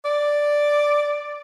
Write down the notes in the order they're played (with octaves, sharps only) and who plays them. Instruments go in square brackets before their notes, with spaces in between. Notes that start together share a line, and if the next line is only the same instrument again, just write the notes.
[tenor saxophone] D5